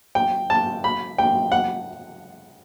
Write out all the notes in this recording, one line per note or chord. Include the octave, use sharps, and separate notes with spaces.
G5
A5
B5
G5
F#5